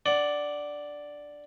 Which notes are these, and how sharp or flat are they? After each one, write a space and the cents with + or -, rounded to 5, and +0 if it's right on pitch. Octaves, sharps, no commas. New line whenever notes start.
D4 +0 D5 +0 F#5 +10